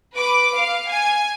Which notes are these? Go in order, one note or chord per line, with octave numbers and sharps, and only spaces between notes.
B4 D6
F5
G#5